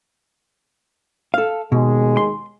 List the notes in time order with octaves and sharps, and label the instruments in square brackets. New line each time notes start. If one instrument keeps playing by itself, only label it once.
[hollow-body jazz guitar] A4 F5
[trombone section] D#2 G#3 [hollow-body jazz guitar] B2
[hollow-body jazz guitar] C6